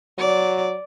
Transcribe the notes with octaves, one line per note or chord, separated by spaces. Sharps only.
F#3 D5